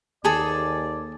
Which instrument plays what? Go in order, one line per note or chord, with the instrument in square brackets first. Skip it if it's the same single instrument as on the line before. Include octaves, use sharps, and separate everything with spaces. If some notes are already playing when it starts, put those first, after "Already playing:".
[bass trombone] D#2 [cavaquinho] G#4 A4 [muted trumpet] D5